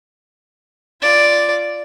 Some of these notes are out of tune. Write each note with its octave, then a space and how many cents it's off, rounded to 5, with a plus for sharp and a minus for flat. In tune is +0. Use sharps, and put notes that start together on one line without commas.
F4 -10 D5 +0